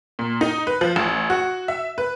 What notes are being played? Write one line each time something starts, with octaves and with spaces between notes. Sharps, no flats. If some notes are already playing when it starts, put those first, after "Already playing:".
A#2
D#4
B4
F3
A1
F#4
E5
B4